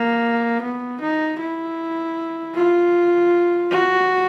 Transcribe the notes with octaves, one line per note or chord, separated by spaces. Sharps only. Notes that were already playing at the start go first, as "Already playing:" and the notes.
Already playing: A#3
B3
D#4
E4
F4
F#4